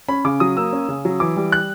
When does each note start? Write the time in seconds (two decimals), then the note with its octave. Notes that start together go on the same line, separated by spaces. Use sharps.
0.08 C#4 B5
0.25 C#3 D6
0.40 F#3 D#6
0.57 A#3 E6
0.73 C#4
0.88 C#3
1.05 F#3
1.20 E3 D6
1.36 G3
1.52 F#6